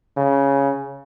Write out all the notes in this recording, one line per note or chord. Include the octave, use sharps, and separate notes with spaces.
C#3